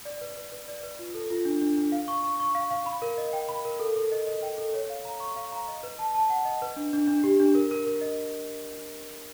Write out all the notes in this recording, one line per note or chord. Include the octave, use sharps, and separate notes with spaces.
D5
B4
B4
B4
D5
B4
F4
A4
F4
D4
D4
D4
F5
C#6
C#6
C#6
F5
F5
B5
A#4
D#5
G5
B5
A#4
A4
A4
D#5
D#5
G5
A4
C#5
F5
A#5
C#6
F5
A#5
D#5
B4
A5
A5
F#5
D#5
B4
D4
D4
D4
G4
D4
A#4
A#4
A#4
D#5